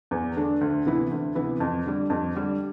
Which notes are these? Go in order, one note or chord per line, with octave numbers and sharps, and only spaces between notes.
E2
D3 A3 D4
D2
C3 E3 B3 E4
D2
C3 E3 B3 E4
F2
D3 G3
F2
D3 G3